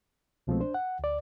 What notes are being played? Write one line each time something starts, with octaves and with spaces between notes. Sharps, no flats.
C2 B2 F3 G#3 A3 C4
D4 C5
F#5
D2 D5